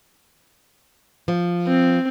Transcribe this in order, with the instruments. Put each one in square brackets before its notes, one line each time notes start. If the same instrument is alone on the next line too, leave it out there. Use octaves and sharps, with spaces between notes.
[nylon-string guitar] F3
[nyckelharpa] C4